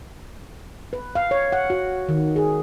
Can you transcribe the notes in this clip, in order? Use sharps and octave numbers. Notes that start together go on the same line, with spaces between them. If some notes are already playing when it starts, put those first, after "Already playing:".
B4
F5
C#5
F#5
F#4
D#3
G#4